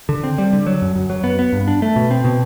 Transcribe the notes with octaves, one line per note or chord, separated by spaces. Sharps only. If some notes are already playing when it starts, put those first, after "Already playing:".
D3
C4
G3
D3
F#3
F#2
F#2
F#3
B3
B3
G2
D4
A3
B2
C4
B2